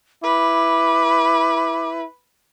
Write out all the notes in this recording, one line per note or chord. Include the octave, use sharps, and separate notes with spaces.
E4 B4 D6